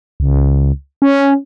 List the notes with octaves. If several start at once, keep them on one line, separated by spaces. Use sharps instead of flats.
C#2
C#4